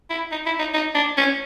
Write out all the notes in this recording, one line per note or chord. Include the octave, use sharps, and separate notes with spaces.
E4
D#4
E4
D#4
D#4
D4
C#4